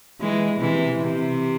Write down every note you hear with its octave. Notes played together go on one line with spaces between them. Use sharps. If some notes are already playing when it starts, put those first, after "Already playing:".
E3 G#3
C3 E3
C3